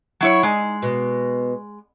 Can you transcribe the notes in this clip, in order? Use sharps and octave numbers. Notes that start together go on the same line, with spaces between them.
F#3 E4 C#5
G#3 D#4
B2